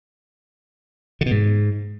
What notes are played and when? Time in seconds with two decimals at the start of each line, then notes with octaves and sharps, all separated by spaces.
1.21 D3
1.26 B2
1.31 G#2